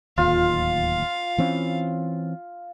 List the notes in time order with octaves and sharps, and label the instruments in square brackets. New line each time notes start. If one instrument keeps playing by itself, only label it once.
[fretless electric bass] D1 G#1 D#2 [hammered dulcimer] F4 [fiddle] F5
[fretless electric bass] E3 C4 C#4